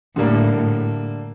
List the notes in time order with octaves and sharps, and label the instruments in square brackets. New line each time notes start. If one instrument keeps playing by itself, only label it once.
[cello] A2 [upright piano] D3 G3 A#3 D4